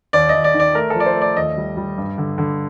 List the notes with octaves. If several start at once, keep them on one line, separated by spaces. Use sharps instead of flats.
D#2 D5
D#2 D#5
D5
D#3
D5
A3 A#4
F3 A4
D5
C5
A3
D5
D#2 D#5
G3
G3
G2
D3
D3